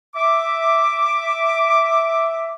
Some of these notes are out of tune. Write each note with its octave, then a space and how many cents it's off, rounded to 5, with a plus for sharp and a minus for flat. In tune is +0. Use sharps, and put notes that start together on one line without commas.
E5 +0 D6 +0